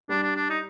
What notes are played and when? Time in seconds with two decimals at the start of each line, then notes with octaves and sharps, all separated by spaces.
0.09 G3 D4
0.23 D4
0.36 D4
0.50 D#4